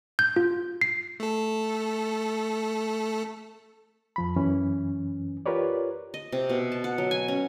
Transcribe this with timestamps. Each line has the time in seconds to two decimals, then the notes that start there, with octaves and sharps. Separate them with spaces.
0.19 G6
0.36 F4
0.81 C7
1.20 A3 A4
4.16 F2 F3 B5
4.36 F#2 E3 C#4
5.46 F4 G4 A#4 B4 C#5 D5
6.14 D#5
6.32 C3
6.49 B2
6.72 A5
6.84 F#5
6.98 F#3
7.11 G#5
7.28 C#4